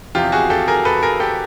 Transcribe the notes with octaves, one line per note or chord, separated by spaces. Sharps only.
E2 C3 F3 F4 G4
F#4 G#4
G4 A4
G#4 A#4
A4 B4
G#4 A#4
G4 A4